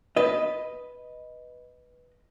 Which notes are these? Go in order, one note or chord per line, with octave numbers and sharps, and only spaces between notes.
B4 D#5